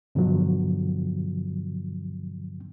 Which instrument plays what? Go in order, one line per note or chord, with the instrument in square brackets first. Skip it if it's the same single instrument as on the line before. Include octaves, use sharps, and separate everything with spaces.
[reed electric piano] G2 B2 D3 F3 F#3